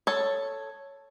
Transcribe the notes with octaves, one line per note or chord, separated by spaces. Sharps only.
A4 C#5